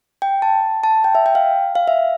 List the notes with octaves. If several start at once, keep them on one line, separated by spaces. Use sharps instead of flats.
G5
A5
A5
G5
E5
G5
F5
F5
E5